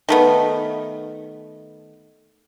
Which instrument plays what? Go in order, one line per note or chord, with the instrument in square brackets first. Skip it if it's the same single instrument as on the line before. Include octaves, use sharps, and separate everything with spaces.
[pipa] D#3 A3 B3